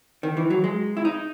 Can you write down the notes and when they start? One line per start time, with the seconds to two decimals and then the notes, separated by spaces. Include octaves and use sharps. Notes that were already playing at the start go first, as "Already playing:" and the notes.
0.23 D#3
0.37 E3
0.50 F#3
0.64 G#3
0.97 E4
1.05 D#4